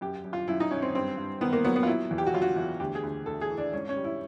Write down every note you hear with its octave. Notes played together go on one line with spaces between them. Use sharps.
F#2 G4
F#2
F4
F#2 E4
D#4
F#2 C#4
C4
G2 C4
G2
D#3 B3
A#3
F#3 B3
B3
F4
F#3 E4
E2
G4
F#4
F#3 F4
F#4
E2
D2 G4
G#4
D2
D2 A4
G#4
E3
D4
G#2 C#4
C#4
G3
E4